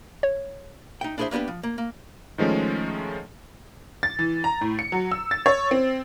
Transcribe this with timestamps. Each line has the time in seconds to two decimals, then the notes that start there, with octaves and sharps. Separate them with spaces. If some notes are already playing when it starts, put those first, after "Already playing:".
0.23 C#5
1.01 D#4 E5 G5
1.18 D4 E4 G#4 A4 C5 E5
1.31 A#3 B3 D4 G4 B4
1.48 F3
1.63 A#3
1.78 A#3
2.38 D#3 F3 G#3 A3 C#4
4.03 A6
4.19 E3
4.44 A#5
4.61 A2
4.79 C#7
4.92 F#3
5.11 E6
5.31 A6
5.46 C#5
5.71 C4